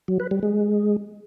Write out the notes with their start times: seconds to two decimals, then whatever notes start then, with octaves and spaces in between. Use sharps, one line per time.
0.08 F#3
0.20 B4
0.31 G3
0.43 G#3